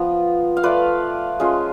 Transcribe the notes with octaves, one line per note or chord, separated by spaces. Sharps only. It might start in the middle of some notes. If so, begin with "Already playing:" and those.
Already playing: F3 B3 F4
F5
A3 F4 B4 D5
G#3 C#4 F4